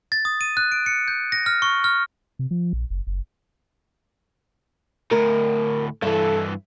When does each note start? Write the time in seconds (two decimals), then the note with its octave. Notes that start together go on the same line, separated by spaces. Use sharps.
0.12 A6
0.25 D#6
0.41 D#7
0.57 F#6
0.72 D7
0.86 C#7
1.08 G6
1.32 A#6
1.46 F6
1.62 C#6
1.84 F6
2.39 C3
2.51 F3
2.73 A#1
2.90 F#1
3.07 F#1
5.11 D2 A2 A#4
6.02 G2 E3 A4 E5